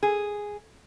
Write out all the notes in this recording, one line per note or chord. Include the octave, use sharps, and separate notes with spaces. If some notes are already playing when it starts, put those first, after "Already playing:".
G#4